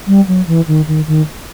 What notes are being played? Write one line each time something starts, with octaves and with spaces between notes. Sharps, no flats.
G3
F#3
E3
D#3
D#3
D#3